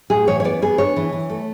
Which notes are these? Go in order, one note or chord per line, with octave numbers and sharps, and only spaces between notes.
A2 G#4
E3 C#5
C#5
B3 D5
B3 G#4
D4 C#5
E3
E3
A3